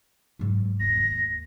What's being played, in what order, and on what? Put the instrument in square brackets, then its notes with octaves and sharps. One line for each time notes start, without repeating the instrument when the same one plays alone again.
[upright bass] G#2 F#3
[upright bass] D#1 F4 [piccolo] A#6
[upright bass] D#2 D#3